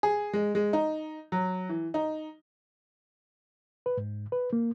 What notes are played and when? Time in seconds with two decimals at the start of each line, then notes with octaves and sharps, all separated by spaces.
0.03 G#4
0.33 G#3
0.55 G#3
0.73 D#4
1.32 F#3
1.69 E3
1.94 D#4
3.86 B4
3.98 G#2
4.32 B4
4.53 A#3